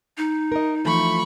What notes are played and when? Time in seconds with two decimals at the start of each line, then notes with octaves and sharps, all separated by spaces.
0.17 D#4
0.52 A#4 D#5
0.84 E3 F3 A3 B5 C#6